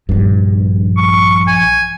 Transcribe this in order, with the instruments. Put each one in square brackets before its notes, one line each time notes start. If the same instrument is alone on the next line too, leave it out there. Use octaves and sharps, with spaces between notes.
[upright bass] A#1 F3 [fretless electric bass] G2
[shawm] C#6
G#5